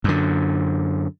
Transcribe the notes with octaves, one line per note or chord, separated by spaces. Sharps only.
F#2 D3